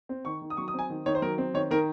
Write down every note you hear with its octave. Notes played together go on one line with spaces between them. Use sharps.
C4
D#3 C#6
D#3
D#6
F#3 C#6
D#6
C4 G#5
D#3
D#3 C#5
C5
F#3 A#4
C4
D#3 C#5
D#3 A#4